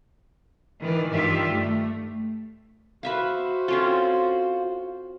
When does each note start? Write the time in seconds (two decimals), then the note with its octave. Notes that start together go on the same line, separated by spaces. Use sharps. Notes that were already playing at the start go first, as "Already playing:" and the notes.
0.80 D#3 E3 D5
1.11 G2 D#3 F4 G4 D5 E5
1.50 A3
3.03 F#4 B4 C5 E5 F5
3.68 C4 C#4 F4 A4